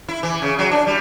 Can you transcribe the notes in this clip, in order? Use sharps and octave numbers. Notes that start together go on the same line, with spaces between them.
E4
E3
C#3
F#3
D4
G3